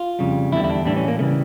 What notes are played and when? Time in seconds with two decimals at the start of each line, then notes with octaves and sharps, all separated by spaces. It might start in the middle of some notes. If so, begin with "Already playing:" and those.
Already playing: F4
0.19 F2 C#3 G3
0.52 E2 D3 G3 E4
0.64 E4
0.70 D4
0.85 A2 E3 G3 D4
0.97 C#4
1.08 A#3
1.19 C#3 E3 G3 A3